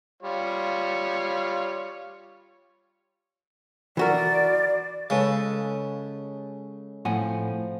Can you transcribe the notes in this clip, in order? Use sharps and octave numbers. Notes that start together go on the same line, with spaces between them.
G3 F4 C#5
E3 F#4 A#4 D5
C#3 G#3 C#4 A4 B4 F5
A2 F3 C4 F#5 G#5